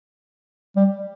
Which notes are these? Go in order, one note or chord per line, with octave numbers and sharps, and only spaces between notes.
G3